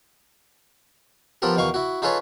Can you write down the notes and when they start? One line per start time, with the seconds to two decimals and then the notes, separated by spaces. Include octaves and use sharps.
1.42 F3 B3 F4 G4 A4 A#4
1.56 E2 B2 D#3 F5 C#6
1.74 E4 F#4
2.02 D#4 F4 G#4 A4 B4 C#5